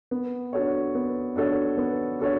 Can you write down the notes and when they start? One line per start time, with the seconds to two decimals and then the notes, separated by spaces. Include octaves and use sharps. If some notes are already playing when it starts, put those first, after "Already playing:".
0.11 B3
0.53 D4 F#4 A4 C#5
0.95 B3
1.36 D4 F#4 A4 C#5
1.78 B3
2.19 D4 F#4 A4 C#5